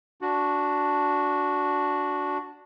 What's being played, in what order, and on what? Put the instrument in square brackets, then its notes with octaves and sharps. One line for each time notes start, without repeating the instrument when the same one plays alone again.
[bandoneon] D4 F#4